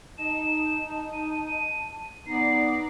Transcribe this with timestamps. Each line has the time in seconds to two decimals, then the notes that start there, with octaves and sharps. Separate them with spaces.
0.18 D#4 A5 E7
1.13 D#7
2.26 B3 D#4 D5 A#5 C7